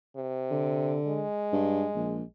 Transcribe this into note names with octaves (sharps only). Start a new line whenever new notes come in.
C3
D3
G#3
G2
A#1